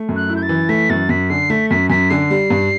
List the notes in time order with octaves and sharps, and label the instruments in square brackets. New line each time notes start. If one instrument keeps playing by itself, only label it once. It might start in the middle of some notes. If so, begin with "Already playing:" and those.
Already playing: [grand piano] A3
F#2
[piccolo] F#6
[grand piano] E4
[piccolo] G6
A6
[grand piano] E3
[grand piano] A3 [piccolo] B6
[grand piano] F#2 [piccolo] A6
[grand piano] F#2 [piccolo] B6
[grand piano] D3 [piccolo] C7
[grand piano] A3 [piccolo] B6
[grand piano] F#2 [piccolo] B6
[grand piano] F#2 [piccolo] B6
[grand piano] D3 [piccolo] C7
[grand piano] G3
G2